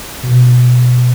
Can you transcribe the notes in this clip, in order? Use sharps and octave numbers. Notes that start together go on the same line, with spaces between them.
B2